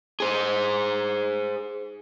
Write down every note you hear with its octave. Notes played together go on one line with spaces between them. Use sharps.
G#4 C5